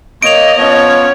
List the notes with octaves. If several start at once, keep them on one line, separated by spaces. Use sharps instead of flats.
A#3 C#5 D#5 D7 F7
F3 B3 C#4 C#5